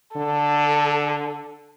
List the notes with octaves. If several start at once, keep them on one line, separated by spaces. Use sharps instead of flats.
D3 A4